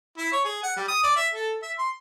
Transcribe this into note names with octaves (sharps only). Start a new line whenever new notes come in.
E4
C#5
G#4
F#5
G3
D#6
D5
E5
A4
E5
C6